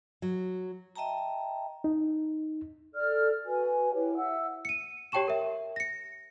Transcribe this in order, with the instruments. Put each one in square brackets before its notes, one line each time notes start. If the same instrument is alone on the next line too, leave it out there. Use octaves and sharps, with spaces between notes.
[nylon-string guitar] F#3
[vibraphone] D#5 E5 G5 A5 A#5
[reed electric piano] D#4
[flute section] A4 D5 F6
F#4 B4 G#5
E4 G4 B4 C#5
E5 F#5 E6
[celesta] C#7 D#7
G4 C#5 G5 A5 C#6 E7
A#4 E5
A#6 C#7